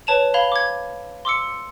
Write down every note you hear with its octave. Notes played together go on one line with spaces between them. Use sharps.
B4 C#5 A5 E7 F7
F5 B5 G#6 F7 G7
D6 G#6
C6 D6 E6 C#7